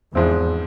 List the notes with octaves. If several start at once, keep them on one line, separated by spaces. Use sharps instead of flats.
E2 G#2 F3 G#3 C4 E4